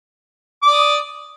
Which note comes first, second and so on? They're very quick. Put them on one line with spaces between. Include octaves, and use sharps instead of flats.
D6 D5 D#6